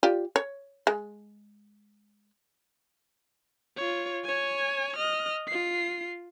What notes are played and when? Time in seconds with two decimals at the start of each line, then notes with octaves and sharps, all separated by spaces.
0.03 F4 G4 D5
0.36 C#5
0.87 G#3
3.77 F4 C#5
4.24 C#5 G#5
4.96 D#5 F6
5.47 F4 C7